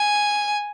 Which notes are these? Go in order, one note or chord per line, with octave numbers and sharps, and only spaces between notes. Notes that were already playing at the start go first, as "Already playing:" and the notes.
Already playing: G#5